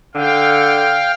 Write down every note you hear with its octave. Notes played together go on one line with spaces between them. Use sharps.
D3 F5 G5